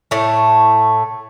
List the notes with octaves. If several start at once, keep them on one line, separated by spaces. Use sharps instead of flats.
A2 A3